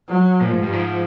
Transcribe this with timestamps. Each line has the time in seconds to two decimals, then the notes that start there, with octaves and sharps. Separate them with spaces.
0.08 F#3
0.40 A#2 F3
0.51 G#2
0.62 G2
0.72 G#2